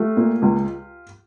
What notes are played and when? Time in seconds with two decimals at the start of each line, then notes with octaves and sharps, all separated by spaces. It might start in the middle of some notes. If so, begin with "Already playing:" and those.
Already playing: A3 F4 G4
0.17 A#2
0.42 C#2